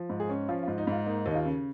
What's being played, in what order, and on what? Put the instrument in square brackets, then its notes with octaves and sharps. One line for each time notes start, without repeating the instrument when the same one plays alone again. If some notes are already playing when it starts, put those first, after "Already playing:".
Already playing: [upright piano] F3
G#2
G#4
C#4
F3 F4
F4
G#2
D#4
G#2 F4
A#3 D#4
D#2
D#4
F4
C#3